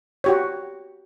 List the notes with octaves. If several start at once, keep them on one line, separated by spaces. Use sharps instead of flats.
F#4 G4 C#5